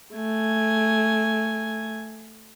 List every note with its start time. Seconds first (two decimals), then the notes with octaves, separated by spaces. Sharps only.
0.14 A3 G#5